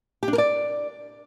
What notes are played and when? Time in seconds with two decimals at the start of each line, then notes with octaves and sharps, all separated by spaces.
0.23 G4
0.28 D4
0.33 A#4
0.38 D5